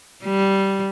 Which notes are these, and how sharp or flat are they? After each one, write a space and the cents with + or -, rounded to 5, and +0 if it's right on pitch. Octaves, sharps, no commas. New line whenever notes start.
G3 -10